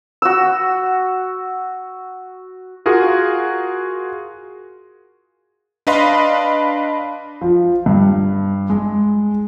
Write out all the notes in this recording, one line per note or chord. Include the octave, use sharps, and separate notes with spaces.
F#4 E6
F4 F#4 G#4 A#4
D4 B4 D#5 F5 B5 C6
F3
G2
G#3